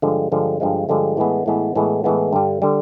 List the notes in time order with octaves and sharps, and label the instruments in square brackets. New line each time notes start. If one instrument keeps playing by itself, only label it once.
[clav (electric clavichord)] G2 D3 F3 G#3
G2 D3 F3 G#3
G2 D3 F3 G#3
G2 D3 F3 G#3
A2 E3 G#3 B3
A2 E3 G#3 B3
A2 E3 G#3 B3
A2 E3 G#3 B3
G2 D3 G3
D3 G3